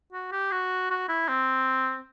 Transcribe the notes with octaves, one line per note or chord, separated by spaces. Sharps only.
F#4
G4
F#4
F#4
E4
C4